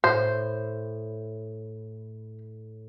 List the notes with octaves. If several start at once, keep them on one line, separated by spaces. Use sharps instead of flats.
A2 C5